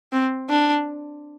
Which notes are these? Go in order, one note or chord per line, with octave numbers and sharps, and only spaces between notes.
C4
D4